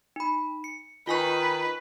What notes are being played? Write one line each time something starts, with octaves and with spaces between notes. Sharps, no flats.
D#4 B5
C#7
D#3 F4 B4 G#5 C#6